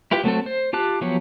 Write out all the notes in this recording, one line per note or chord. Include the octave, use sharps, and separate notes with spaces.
E4 F4 G4 B4 G5
F#3 A3 C4 A4
C5
F4 G4 A5 F#6
F3 F#3 B3 G4 C#5